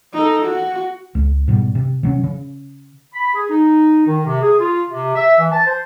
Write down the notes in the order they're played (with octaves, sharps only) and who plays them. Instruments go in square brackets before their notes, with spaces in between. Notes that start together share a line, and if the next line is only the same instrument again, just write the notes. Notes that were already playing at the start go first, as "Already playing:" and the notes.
[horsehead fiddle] D#4 A4
F#4
[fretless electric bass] C#2
G#2 B2 G3
C3
C3 F#3 C#4
C#3
[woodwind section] B5
G#4
D#4
D#3
C3
G#4
F4
C3
E5
E3
A5
C5